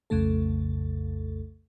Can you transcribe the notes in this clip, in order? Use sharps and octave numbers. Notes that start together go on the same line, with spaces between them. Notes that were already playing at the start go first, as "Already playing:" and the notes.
B1 F2 C#3 A3 A4